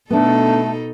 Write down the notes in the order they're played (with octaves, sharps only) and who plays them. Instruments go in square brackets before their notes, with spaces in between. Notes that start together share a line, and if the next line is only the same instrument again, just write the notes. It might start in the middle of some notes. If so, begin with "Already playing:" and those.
[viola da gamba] B2 D#4 A4 [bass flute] A3 [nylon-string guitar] B3 D4